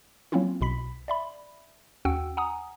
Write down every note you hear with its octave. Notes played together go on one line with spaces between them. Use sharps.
F#3 A#3 C4 C#4 E4 F4
B1 B2 B5 B6
D5 E5 B5
D#2 C#4 F#4 F#5 G5 E6
F#5 G#5 A#5 D#6